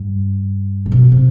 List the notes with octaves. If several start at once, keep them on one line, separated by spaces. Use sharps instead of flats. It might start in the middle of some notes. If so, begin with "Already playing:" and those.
Already playing: G2
A2
B2
C3